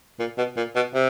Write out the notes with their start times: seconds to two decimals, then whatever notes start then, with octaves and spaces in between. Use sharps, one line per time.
0.19 A#2
0.38 B2
0.57 A#2
0.75 B2
0.94 C3